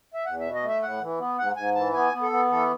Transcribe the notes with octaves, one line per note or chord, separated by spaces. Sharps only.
E5
E2 F#5
B2 E5
D#5
A3
E5
A2 F#5
E3
B3
G#2 F#5
G#2 G#5
E3 A5
B3 G#5
B3
A4
B3
E3 A4